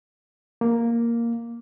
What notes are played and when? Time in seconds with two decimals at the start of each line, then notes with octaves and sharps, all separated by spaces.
0.61 A#3